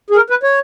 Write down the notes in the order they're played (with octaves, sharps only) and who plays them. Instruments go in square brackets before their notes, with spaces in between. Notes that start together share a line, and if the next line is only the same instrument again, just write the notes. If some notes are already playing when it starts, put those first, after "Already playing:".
[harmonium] G#4
A#4
B4
C#5